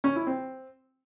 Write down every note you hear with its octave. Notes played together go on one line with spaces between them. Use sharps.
C#4
E4
C4